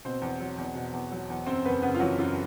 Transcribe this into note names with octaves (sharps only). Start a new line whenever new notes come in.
B2 C4 C5
E2
F#3
E2
B2
E2
F#3
E2
F#2 C4 C5
F#1 B3 B4
C#3 B3 B4
F4
E3 F#3 F#4
F#2 F4